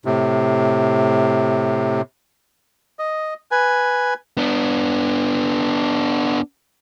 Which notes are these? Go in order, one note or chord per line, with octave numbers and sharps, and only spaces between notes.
A2 C3
D#5
B4 G#5
B3 D4